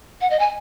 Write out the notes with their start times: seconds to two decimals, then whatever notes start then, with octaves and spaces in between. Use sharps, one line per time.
0.21 F#5
0.30 D#5
0.39 G#5